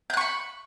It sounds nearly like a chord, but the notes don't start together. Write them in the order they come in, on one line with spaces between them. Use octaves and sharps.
G6 F#6 C#6 B5